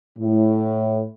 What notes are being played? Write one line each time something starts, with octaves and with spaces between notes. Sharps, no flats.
A2